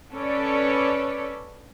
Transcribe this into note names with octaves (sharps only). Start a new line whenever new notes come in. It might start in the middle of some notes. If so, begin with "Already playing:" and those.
C#4 A4 B4 C#5 D5